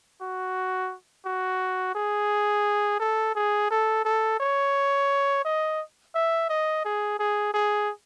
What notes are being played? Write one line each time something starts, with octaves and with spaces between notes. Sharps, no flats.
F#4
F#4
G#4
A4
G#4
A4
A4
C#5
D#5
E5
D#5
G#4
G#4
G#4